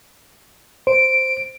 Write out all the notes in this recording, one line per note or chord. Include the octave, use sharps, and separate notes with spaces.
C5 D7